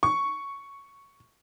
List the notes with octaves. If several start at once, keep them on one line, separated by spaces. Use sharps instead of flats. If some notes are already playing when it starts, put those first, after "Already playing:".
C#6